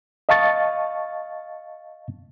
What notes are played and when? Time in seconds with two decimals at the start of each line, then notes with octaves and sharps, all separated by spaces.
0.29 D#5 F5 A5 C#6 A6